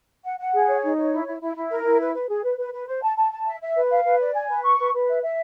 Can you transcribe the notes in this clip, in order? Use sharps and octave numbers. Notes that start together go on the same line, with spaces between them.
F#5
F#5
G#4
C#5
D#4
C#5
E4
E4
E4
E4
A#4
E4
B4
B4
G#4
B4
B4
B4
C5
A5
A5
A5
E5
E5
B4
F5
B4
D5
G#5
B4
C#6
B4
B4
E5
E5